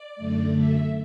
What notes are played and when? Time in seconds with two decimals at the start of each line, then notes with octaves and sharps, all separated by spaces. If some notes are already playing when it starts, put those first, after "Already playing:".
Already playing: D5
0.16 F#2 D3 A3
0.54 E5